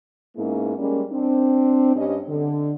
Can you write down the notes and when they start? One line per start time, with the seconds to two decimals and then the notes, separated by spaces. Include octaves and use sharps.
0.37 G#2 G#3 A#3 B3 C#4 E4
0.78 G3 G#3 A#3 C#4
1.11 C4 D4
1.95 G2 C#4 G4 D#5
2.28 D3